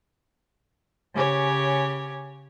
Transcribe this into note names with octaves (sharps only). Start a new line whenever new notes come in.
C#3 G4 C#5 G#5